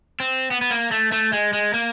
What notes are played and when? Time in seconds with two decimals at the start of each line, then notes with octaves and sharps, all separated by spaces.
0.20 C4
0.51 B3
0.61 B3
0.71 A#3
0.91 A3
1.12 A3
1.33 G#3
1.53 G#3
1.74 A#3